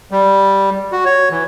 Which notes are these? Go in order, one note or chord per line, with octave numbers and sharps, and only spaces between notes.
G3
F#4
C#5
E3